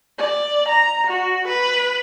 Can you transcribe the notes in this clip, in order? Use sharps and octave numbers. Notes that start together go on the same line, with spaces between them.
D5
A#5
F#4
B4